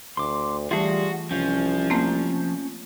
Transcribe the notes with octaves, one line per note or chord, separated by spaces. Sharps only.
D2 C6 D6
E3 G3 A3 F4 F#4 G#4 F5
C2 F3 C#4
A3 A#3 C4